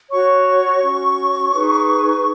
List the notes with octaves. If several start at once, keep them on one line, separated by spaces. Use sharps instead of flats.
F#4 C#5 C#6
C#4 F#4 C#5
D#4 G#4 B4